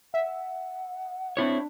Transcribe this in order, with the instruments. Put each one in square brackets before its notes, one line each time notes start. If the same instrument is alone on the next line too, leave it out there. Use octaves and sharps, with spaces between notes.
[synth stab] E5 [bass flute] F#5
[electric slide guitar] C4 E4 C#5 [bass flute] D4